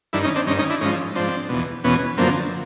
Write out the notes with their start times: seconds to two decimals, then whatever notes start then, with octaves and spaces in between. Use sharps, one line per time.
0.13 G2 D#3 D4 E4
0.24 C#4 D#4
0.36 C4 D4
0.47 G2 C#4 D#4
0.51 D#3
0.59 C#4 D#4
0.70 D4 E4
0.81 G#2 F3 C#4 D#4
1.15 G#2 F3 C4 D4
1.49 E2 B2
1.84 E2 B2 B3 C#4
2.18 F#2 D3 F3 A#3 C4